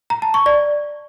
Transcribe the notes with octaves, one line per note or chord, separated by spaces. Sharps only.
A#5
A5
C#6
D5